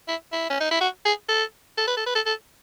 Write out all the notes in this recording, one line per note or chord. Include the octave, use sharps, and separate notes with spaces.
E4
E4
C#4
D#4
E4
F#4
G#4
A4
A4
B4
A4
B4
A4
A4